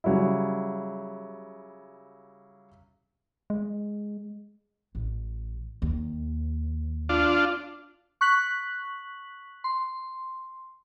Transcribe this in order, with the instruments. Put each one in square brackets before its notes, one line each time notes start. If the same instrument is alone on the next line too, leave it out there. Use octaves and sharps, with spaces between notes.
[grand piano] C#3 F#3 G3 E4
[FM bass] G#3
[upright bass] A1
D#2
[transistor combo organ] D4 F4
[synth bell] C#6 F#6 B6 F#7
C6